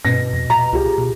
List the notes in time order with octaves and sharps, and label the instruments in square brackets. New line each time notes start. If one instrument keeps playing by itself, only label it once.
[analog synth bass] G2 [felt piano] B2 A#6
[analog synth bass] F2
[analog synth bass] A#2 [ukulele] A#5
[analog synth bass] C#2 [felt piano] F4 G4 G#4
[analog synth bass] B2